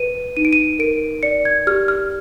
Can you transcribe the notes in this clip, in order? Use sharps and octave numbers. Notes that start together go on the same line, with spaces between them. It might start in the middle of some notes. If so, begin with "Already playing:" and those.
Already playing: B4 D#7
D#4 D#7
D7
D#7
A#4 D7
D5 C#7
G#6
G4 F6
F6